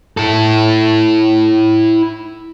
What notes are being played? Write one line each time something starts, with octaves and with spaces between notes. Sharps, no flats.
E4 A4